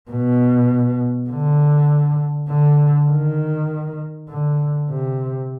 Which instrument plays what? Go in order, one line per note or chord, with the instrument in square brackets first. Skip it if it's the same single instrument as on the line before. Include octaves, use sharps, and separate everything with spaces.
[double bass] B2
D3
D3
D#3
D3
C3